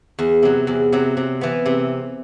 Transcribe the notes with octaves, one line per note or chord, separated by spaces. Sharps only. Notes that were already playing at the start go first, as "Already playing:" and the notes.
E2
C3 F#3
E2
C3 F#3
C3
E3 B3
C3